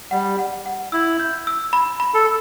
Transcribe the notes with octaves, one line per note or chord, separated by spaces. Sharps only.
G3 F#5
F#5
F#5
E4 E6
G6
E6
B5
B5
A4